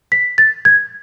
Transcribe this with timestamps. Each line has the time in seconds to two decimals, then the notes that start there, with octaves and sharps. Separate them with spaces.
0.12 B6
0.38 A6
0.65 G#6